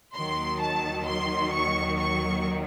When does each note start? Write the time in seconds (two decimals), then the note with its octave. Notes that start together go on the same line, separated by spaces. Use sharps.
0.15 D#2 D#3 F#3 C6
0.61 A5
1.06 C6
1.53 C#6
1.99 C#6